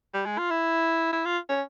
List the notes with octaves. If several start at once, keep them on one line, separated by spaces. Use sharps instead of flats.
G3
G#3
F4
E4
E4
F4
C#4